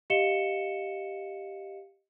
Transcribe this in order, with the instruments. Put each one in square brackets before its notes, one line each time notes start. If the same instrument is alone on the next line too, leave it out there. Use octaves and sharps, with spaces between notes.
[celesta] G4 D#5 F5 C#7 E7 G7